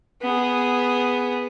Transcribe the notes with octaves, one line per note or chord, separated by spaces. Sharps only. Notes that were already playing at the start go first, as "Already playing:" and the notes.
B3 G#4